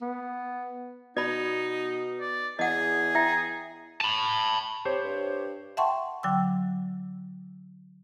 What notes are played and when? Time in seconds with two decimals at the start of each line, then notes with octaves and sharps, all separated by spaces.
0.01 B3
1.17 B2 D#4 D5 B5
2.20 D5
2.59 E2 G#4 D#5 F#5
3.15 E4 E5 G5
4.01 A5 B5
4.85 C4 G4 C5 C#5
5.05 G2
5.77 E5 F#5 G5 A5 C6 C#6
6.23 D3 F#3 G5 D6 E6